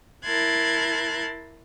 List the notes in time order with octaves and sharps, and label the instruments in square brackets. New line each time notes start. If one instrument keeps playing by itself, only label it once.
[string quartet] E4 A#4 A5 C6 F#6 G#6